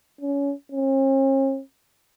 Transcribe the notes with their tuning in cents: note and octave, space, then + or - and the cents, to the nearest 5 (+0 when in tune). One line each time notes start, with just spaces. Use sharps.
C#4 +25
C#4 -45